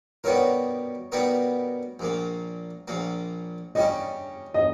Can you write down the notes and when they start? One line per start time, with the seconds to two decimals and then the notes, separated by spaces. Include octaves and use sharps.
0.24 B2 G3 B3 D#4 A#4 C#5
1.12 B2 G3 B3 D#4 A#4
1.99 A#1 A#2 A#3
2.88 A#1 A#2 A#3
3.75 C#3 G3 C#4 D#5
4.54 D#5